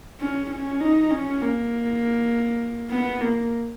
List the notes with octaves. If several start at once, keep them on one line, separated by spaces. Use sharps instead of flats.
C#4
C#4
D#4
C#4
A#3
B3
A#3